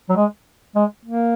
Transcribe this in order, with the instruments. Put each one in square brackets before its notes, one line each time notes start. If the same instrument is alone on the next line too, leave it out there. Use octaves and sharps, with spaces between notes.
[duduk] F#3
G#3
G#3
A#3